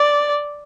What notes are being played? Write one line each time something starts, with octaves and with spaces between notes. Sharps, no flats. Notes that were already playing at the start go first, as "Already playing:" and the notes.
Already playing: D5